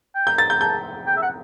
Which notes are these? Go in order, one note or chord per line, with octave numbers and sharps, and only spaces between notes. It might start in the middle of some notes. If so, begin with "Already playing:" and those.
G5
G6
A6
G6
A5 G6
G5
E5
F#5